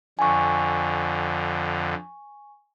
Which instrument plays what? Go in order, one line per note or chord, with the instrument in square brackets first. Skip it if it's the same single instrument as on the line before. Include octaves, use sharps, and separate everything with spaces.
[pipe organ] F2 D3 [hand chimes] G#5 C#6